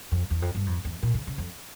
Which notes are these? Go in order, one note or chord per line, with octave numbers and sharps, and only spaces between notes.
F2
E2
F2
G2
F2
E2
A#2
C#3
C#3
F2